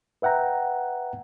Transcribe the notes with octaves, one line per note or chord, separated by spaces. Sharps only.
B4 E5 F#5 G5 A#5